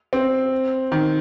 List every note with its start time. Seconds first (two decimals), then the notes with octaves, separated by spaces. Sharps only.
0.13 C4
0.92 D#3